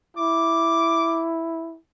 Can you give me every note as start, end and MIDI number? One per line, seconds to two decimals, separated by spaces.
0.17 1.78 64
0.17 1.22 86